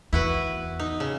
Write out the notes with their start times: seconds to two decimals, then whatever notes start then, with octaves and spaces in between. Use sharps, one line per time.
0.13 E2 E4 F#4 B4
0.79 D#4
1.00 C#3